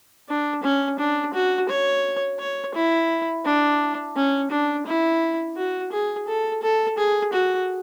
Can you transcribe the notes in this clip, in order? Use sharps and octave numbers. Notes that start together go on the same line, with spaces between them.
D4
C#4
D4
F#4
C#5
C#5
E4
D4
C#4
D4
E4
F#4
G#4
A4
A4
G#4
F#4